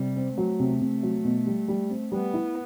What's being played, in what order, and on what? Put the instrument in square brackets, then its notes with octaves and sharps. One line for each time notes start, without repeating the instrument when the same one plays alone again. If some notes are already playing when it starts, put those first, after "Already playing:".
Already playing: [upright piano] C3 [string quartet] G3
[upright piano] C4
[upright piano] F#3 [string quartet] A3
[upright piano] C3
C3
F#3
B2
G3
G3
C4
[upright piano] G3 [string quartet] B3
[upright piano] E4